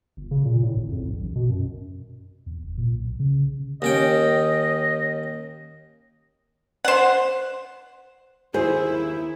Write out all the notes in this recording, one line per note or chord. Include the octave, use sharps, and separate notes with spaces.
G1
C#3
A#2
A2
G#1
F2
B1
A1
B2
F#2
E2
F1
A#2
B1
C#3
D#2 C#4 D#5 G5
C5 F#5
D#2 E4 G#4 C5